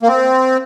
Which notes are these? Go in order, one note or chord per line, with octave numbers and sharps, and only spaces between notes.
A#3
C4